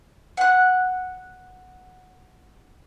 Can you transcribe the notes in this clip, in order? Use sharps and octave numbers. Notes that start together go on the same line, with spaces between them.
F#5 F#6